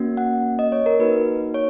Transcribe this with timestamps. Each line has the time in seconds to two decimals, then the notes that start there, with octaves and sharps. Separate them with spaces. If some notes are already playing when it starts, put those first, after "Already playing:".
Already playing: A#3 C#4 F#4
0.17 F#5
0.59 D#5
0.72 C#5
0.86 A#4
1.00 A#3 D#4 F#4 B4
1.54 C#5